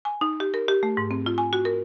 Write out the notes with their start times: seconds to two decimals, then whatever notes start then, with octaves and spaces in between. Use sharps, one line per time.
0.05 G#5
0.21 D#4
0.40 G4
0.54 A#4
0.68 G4
0.83 A3
0.97 G#2
1.11 C4
1.26 F4
1.38 G#5
1.53 F#4
1.65 A#4